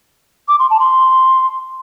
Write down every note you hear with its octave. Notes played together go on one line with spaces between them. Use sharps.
D6
C6
A5
C6